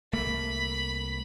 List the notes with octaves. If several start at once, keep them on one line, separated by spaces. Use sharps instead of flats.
C2 A3 A#3 B5